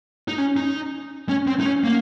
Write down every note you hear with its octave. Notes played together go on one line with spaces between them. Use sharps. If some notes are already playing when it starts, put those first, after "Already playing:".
D#4
C#4
D#4
C#4
C4
D#4
C#4
A#3